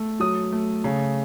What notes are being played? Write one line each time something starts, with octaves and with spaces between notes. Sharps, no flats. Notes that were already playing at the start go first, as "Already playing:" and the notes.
Already playing: A3
F#3 D#6
A3
C#3